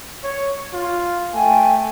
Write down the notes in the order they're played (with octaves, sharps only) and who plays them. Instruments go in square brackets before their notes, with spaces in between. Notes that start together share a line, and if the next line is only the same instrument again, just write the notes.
[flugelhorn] C#5
F4
[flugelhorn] A3 [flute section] G5 G#5